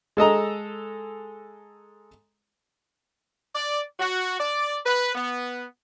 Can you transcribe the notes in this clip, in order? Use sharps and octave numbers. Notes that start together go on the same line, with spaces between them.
G#3 A4 D#5 A#5
D5
F#4
D5
B4
B3